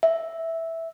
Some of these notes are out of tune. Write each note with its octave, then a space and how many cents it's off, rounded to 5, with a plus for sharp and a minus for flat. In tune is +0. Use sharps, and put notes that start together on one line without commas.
E5 -5